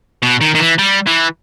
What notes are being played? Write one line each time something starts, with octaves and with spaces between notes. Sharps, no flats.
B2
D#3
D#3
E3
G3
E3